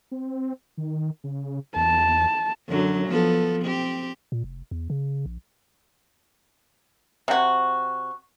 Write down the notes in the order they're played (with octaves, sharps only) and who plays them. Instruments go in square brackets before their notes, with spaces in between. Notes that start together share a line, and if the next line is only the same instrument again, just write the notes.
[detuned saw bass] C4
D#3
C#3
[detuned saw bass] E2 [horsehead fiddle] A5
[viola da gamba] F#2 D3 F#3
F3 B3 A4
C4 G4
[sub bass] A#2
F1
E2
C#3
A#1
[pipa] C3 F#4